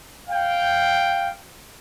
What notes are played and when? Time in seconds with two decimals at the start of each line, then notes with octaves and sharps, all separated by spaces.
0.29 F5 G5